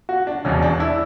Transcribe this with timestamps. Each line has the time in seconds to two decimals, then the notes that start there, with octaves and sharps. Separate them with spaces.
0.09 F#4
0.27 D4
0.45 E1 E2 B2 C#4
0.62 D4
0.80 E4